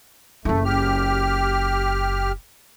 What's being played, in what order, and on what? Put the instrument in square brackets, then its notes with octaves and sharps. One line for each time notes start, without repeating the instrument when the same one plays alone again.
[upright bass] F#1 E4 [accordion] A3
[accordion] G4 F6